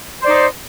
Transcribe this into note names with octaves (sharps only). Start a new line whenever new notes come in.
D#4 C5 D5